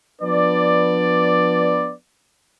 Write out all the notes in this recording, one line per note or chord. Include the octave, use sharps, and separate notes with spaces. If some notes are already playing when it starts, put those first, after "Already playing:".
F3 B3 D4 B4 D5